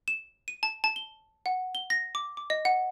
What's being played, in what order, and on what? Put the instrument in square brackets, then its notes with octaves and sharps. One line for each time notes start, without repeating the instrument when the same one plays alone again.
[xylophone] E7
D#7
A5
A5
G7
F#5
G7
A#6
D6
D6
D#5
F#5